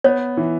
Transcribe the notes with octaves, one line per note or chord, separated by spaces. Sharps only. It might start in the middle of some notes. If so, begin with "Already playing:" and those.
B3 C#5
E3